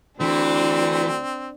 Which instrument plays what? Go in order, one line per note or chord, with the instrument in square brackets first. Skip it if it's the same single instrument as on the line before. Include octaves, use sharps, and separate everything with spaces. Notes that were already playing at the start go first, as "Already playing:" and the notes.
[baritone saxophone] D2 [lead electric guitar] E3 [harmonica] C4 [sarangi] D4